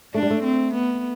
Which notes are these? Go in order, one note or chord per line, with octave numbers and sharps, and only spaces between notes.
A3 D4
G3
A3
C4
B3